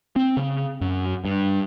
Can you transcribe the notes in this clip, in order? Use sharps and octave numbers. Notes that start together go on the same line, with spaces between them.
C4
C#3
F#2
G2